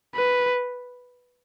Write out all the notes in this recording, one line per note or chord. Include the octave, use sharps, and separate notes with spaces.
B4